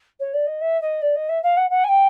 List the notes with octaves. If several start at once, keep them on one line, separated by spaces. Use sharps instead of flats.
C#5
D5
D#5
E5
D#5
D5
D#5
E5
F5
F#5
F#5
G#5
G5